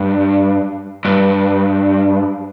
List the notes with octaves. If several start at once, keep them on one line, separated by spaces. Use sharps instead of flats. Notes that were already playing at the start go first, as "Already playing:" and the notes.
Already playing: G2
G2